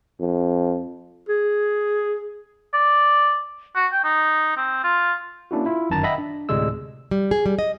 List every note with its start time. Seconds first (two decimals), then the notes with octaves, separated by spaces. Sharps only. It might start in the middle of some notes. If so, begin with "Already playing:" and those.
0.20 F2
1.29 G#4
2.74 D5
3.76 F#4
3.92 G5
4.04 D#4
4.57 C4
4.84 F4
5.51 A#3 C#4 D4 E4 F#4
5.66 E4 F4
5.90 G1 F#2 D#3 A5 A#5 A6
6.03 D#5 E5 F#5 G5 B5 A#6
6.18 D4
6.49 D2 A2 C3 G#3 D5 E6
7.11 G3
7.31 G#4
7.46 G3
7.59 D#5